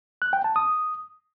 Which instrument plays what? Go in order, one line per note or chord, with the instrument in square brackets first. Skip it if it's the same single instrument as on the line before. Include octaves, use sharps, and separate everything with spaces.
[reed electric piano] F#6
G5
A5
D#6